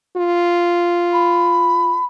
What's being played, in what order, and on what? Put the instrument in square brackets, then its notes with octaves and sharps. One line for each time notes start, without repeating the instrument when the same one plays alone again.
[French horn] F4
[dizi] B5